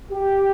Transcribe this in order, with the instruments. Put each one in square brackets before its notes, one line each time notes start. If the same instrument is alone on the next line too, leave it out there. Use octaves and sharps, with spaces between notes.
[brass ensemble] G4